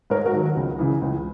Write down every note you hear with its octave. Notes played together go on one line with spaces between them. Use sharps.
G#2 A#4 C#5
F#4 A#4
D#3 F#3
C#2
C#3 E3
C#2